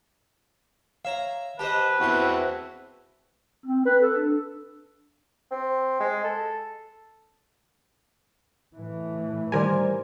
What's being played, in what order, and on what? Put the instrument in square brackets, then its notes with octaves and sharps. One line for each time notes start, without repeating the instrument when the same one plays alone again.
[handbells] C#5 F5 [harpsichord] E5 A#5
[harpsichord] G4 C5 D#5 [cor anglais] B4 [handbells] A5
[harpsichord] E2 C6 [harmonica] C4 E4 F#4
[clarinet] C4
B4
A4
D4
[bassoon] C4
G#3
A4
[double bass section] A2 E3
[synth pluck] D#3 A#4 G#5 [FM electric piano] G3 C5 D5